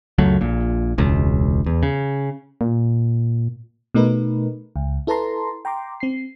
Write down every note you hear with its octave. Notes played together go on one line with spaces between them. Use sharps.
C#2 F#2 F#3 A3
A#1 A#2
E1 C#2
E2
C#3
A#2
B2 A3 D#4 A#4 B4
C#2
E4 A4 B4 A5 A#5 C6
G5 A#5 C6 D6
C4 C7